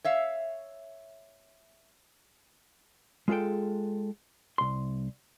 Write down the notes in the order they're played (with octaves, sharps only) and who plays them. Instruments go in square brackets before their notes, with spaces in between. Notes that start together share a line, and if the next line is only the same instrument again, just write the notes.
[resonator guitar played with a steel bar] C#5 E5 F5
[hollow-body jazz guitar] G#3 F4 G#4 A4 G5
C2 C6